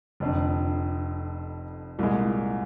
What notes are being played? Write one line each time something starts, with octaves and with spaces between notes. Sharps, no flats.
F1 F2 D3
C2 A#2 G#3